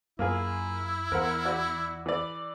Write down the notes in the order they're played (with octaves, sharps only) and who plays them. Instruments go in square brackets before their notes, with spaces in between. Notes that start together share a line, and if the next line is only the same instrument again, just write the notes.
[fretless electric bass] F#2 [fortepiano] A#3 F4 G#4 [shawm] E4
[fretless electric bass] E2 [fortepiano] A#4 C5 F#5
[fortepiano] F#4 D5
E3 D5